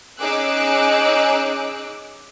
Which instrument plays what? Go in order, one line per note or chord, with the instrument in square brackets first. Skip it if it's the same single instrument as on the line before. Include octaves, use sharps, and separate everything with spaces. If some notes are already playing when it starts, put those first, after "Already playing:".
[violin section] C#4 D#4 G#4 D6 E6 F#6